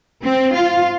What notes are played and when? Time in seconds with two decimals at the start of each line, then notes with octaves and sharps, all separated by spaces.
0.23 C4
0.55 F4